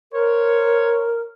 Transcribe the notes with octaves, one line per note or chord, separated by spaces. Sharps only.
A#4 C5 C#5